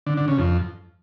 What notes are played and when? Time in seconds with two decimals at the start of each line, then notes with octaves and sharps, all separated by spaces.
0.07 D3
0.17 D3
0.28 C#3
0.39 F2